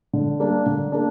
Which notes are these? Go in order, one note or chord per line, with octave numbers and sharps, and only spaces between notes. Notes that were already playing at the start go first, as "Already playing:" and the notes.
D3
G3 A#3 D4
D3
A#3 D4